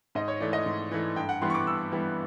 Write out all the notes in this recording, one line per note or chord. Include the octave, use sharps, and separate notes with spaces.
G#2 D#5
C#5
E3 A3 D5
D#5
G#2
E3 A3
G2 G5
F#5
E3 G3 B3 C6
C#6
D6
G2 E6
E3 G3 B3